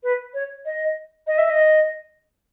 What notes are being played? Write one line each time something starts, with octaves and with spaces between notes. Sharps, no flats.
B4
C#5
D#5
D#5
E5
D#5